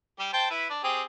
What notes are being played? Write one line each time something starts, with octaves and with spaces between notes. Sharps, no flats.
G3 G4
C5 G5 A5
E4 B4
D4
C4 G4 G#4